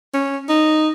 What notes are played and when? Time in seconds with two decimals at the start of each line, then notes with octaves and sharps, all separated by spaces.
0.14 C#4
0.49 D#4